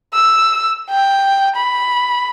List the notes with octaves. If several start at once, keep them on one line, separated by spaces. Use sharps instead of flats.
E6
G5
B5